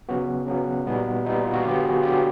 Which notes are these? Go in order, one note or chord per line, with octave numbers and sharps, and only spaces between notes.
C#3 F#3 B3 F#4
C#3 F#3 B3
A#2 G3 B3 D#4
A#2 G3 B3 D#4
F4
F#4
D3 F#3 B3 F4 G4
F#4 G#4
D3 F#3 B3 F4 G4